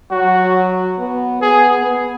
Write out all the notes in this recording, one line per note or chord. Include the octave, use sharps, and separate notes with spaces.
F#3 F#4
B3
B3 G#4
B3